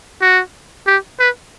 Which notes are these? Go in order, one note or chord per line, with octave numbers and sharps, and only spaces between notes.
F#4
G4
B4